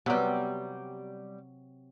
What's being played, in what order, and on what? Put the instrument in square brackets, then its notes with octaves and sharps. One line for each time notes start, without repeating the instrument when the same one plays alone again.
[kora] C3 F#3 C4 [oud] G3 B3